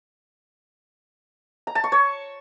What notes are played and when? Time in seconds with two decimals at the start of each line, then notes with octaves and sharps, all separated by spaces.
1.67 A#5
1.75 A5
1.84 C#6
1.92 C#5